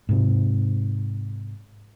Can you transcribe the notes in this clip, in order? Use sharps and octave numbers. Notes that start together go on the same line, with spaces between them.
G#2 C3